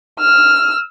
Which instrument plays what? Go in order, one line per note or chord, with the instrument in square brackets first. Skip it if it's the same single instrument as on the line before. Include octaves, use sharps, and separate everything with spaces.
[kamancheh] E6 F6